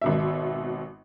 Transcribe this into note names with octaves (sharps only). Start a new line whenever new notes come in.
G#1 B2 E5